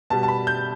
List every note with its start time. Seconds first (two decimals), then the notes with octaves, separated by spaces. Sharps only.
0.10 B2 G3 A5
0.23 A5
0.28 B5
0.47 G6